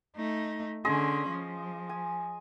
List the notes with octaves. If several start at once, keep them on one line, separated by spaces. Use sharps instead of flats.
A3 D#4
D3 C#4 G#4 D#5 C6
F3
G#5